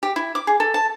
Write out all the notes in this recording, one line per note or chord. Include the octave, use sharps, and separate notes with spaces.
G4
E4
D6
G#4
A4
A5